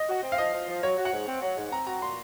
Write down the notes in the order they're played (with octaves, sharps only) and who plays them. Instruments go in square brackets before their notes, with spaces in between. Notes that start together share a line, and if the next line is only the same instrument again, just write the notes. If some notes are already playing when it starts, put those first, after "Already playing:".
Already playing: [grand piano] D#5
[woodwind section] F#4
C4
[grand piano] F5
[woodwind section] F3 [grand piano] D#5
[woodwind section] F3
F3
[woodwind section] F#3 [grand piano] C#5
[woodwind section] F#4
[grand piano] F#5
[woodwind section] G#2
C4
F#3
G#2
[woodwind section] C4 [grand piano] A#5
[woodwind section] F#4 [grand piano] A#5
[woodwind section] A#2 [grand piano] C6